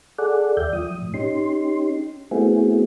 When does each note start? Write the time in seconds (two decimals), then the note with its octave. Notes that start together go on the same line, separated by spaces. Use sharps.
0.19 G#4 A4 D5 F#5
0.57 D#2 D5 E5 G5 G6
0.73 F3 D#6
1.02 A2
1.14 C#4 D#4 G4 C6
2.31 A3 B3 C4 E4 F#4 G#4